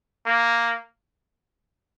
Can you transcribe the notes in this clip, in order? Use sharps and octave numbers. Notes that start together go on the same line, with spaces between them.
A#3